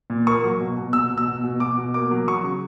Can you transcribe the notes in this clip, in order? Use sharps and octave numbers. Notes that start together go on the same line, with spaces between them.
A#2
A#3 C#6
F#3
B2
B2
B2 E6
B2
E6
B2
B2
B2 D6
B2
A#3 D6
F#3
F#3 C#6
C#3